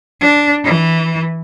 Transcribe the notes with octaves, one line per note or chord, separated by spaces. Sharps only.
D4
E3